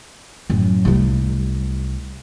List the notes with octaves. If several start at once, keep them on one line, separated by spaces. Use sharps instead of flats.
F#2 A2
C2 A3